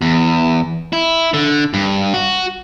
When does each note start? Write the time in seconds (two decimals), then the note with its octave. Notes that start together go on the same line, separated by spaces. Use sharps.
0.01 E2
0.93 E4
1.34 D3
1.73 G2
2.14 F#4